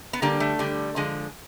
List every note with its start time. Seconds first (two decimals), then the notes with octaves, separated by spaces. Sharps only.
0.13 B3
0.22 D3 G3 A#3
0.40 A3
0.59 D3 G3
0.96 D3 F3 G#3